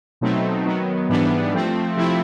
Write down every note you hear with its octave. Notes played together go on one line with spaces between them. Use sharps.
B2 F#3 A3 C4 D#4
D#3 F#3 B3
G#2 E3 G3 B3 D4
F3 A3 C4
C3 F3 A3 C4 E4